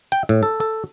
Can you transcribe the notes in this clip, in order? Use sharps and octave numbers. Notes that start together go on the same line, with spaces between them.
G5
A2
A4
A4